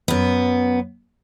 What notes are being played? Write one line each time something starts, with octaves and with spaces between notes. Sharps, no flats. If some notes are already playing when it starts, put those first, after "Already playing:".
F#2 B3